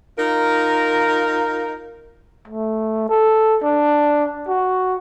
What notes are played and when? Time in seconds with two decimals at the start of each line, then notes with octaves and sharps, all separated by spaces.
0.18 D#4 F4 A#4
2.48 A3
3.09 A4
3.64 D4
4.48 F#4